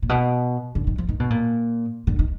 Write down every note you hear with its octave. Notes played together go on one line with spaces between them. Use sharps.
A#2
B2
D3
D#3
F3
D#3
B2
A#2
D3
D#3